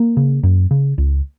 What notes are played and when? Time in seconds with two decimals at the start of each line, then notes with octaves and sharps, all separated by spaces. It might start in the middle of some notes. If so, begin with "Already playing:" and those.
Already playing: A#3
0.17 C#3
0.43 F#2
0.71 C#3
0.98 C#2